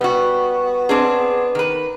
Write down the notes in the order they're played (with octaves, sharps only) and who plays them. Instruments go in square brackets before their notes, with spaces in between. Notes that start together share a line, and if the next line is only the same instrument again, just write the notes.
[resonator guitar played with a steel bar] G3 F#4 [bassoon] B3
[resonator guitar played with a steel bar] C4 D4 G#4
D#3 B4